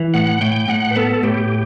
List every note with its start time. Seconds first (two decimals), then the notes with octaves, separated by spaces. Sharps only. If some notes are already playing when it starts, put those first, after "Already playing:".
Already playing: E3
0.14 A2 F#5
0.41 A2 G5
0.68 A2 F#5
0.91 B4
0.95 B3 A4
1.23 A2 G4